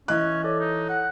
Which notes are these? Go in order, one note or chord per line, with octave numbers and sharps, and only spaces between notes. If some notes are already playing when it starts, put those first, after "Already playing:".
E3 C#4 D#5 F#6
A4 C#5 D5
D#4
F#5